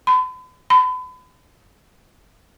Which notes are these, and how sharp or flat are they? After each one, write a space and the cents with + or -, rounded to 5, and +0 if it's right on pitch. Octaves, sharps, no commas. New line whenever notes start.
B5 +45
B5 +35